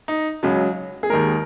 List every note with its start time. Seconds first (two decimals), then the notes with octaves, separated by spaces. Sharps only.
0.08 D#4
0.43 C#2 C#3 F#3
1.03 G#4
1.10 D#2 D#3 G#3 A#4